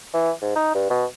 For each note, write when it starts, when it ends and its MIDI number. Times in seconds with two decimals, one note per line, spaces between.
0.14 0.31 52
0.42 0.53 44
0.56 0.71 63
0.74 0.87 43
0.90 1.05 47